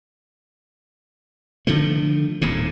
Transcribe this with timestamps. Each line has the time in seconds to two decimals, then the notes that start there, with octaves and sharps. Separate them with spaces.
1.67 D3 D#3 F3 A3
2.42 D#1 D#2 A2 C3